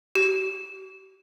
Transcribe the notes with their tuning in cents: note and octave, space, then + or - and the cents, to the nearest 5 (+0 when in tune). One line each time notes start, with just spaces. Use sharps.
G4 -40